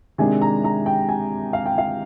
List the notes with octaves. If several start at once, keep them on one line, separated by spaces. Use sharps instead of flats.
C3 D#3 G#3 D4 G#5
A#5
A#5
G5
G#5
F5
G5
F5